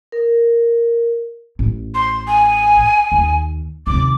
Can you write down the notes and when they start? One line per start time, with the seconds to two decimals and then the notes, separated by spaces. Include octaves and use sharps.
0.12 A#4
1.59 A1
1.95 C6
2.27 G#5
3.12 D#2
3.87 D#2 C3 D6